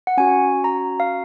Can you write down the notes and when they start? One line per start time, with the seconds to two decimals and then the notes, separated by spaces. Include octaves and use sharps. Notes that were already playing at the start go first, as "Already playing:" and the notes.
0.07 F#5
0.17 C#4 F#4 G#5
0.64 A#5
1.00 F5